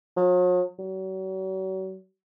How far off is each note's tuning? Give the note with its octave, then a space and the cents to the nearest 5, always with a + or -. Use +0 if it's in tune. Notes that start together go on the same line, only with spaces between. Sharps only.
F#3 -45
F#3 +40